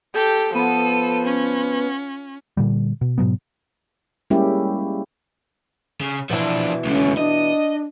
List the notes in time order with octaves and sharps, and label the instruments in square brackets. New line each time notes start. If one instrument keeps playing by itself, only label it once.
[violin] G4 [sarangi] A4 [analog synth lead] G6
[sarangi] F3 [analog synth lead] B3 [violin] A4 D#7
[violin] C#4
[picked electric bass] A#2 D3 G3
B2
G#2 B2 F#3 B3
[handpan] G3 G#3 A#3 C#4 E4 G4
[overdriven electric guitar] C#3
[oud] B2 E3 [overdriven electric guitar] F3 D4
[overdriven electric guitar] C#2 D3 [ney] C#4
[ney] D4 [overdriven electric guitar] D#5